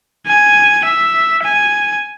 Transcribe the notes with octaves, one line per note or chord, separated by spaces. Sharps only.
G#5
E5
G#5